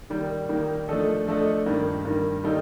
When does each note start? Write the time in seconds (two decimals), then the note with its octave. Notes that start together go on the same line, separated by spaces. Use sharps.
0.10 D#3 G3 A#3
0.49 D#3 G3 A#3
0.88 F3 A3 D4 A4 D#5
1.27 F3 A3 D4 A4 D#5
1.66 G2 D#3 A#3
2.05 G2 D#3 A#3
2.44 D#3 G3 A#3 D#4 A4